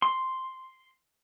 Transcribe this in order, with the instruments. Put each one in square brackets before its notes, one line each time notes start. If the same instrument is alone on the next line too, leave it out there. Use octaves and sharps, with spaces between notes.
[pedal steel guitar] C6